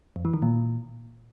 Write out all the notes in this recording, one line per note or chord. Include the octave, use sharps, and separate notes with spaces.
F2
E3
D#3
A#2